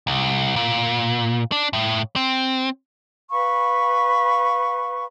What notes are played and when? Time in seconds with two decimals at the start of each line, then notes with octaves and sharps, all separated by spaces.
0.07 C2
0.56 A#2
1.52 D4
1.73 A2
2.16 C4
3.30 B4 F5 B5 C#6